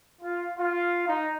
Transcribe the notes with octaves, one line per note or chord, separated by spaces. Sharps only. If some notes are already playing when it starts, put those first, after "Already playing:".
F4
F4
D#4